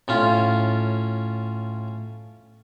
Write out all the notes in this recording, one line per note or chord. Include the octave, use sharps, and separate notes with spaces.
A2 C#4 F4